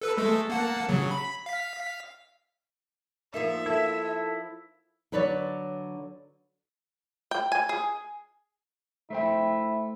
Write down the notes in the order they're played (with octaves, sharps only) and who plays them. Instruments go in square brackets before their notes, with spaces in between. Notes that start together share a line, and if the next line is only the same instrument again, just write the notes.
[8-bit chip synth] A4 B4 E6
G#3 A3 A4
A#3 F#5 A5
C#3 F#3
B5
F5 B6
[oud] F3 A#3 D#4 [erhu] E5
[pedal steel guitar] E4 [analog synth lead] A4
[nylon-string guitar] D3 F#3 B4 C#5 D5
[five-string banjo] G5
G#5
G#4
[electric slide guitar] A3 C5 G5 [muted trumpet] E4 [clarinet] E5